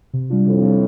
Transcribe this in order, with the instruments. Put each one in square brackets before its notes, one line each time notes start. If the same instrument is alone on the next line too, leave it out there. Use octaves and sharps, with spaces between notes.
[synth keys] C3
G3 D4 F4
[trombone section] F2 A2 [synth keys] C3
[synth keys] G3 D4 F4